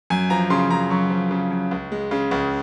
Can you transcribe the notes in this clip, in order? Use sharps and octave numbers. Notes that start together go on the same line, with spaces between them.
F#2 G#5
F3 A#5
C#3 C6
F#2 A#5
F#2 C#6
F3
C#3
F#2
C#2
G#3
C#3
C#2